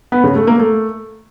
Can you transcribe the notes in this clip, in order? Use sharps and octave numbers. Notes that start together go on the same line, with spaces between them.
B3
C#3
A3
A#3
A3